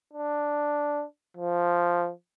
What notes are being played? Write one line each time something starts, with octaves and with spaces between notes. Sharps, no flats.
D4
F3